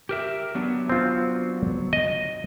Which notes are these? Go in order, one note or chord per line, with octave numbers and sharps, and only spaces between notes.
G4 A#4 E5
F#3 B3 D4
C4 F4
D#5